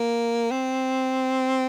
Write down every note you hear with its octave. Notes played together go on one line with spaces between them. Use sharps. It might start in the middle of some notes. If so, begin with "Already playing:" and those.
Already playing: A#3
C4